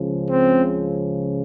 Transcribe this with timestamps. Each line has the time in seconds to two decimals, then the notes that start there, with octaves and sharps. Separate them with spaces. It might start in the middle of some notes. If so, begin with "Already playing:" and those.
Already playing: C#2 C#3 F3
0.29 C4